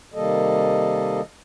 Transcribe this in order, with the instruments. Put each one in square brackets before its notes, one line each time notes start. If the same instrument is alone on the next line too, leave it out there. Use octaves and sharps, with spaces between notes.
[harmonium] C3 D#3 G3 A#3 A4 D#5